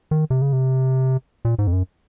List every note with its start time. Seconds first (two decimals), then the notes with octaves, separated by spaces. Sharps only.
0.11 D#3
0.30 C3
0.42 C#3
0.53 C3
1.45 A#2
1.59 G#2
1.67 F2
1.73 F#2